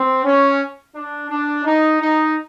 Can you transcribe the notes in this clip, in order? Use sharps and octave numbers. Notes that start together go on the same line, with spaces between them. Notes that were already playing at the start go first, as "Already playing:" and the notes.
Already playing: C4
C#4
D4
D4
D#4
D#4